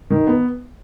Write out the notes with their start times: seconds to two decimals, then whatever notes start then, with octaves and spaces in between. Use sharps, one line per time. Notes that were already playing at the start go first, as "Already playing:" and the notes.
0.10 D#3
0.27 B3